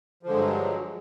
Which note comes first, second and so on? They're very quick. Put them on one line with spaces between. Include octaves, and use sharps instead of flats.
F3 D3 G#3 G2 F#3